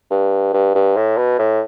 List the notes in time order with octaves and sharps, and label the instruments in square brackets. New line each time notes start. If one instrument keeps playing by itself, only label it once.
[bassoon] G2
G2
G2
A2
B2
A2